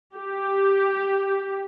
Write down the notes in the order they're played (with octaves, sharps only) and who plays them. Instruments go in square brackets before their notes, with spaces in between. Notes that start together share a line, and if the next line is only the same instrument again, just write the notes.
[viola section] G4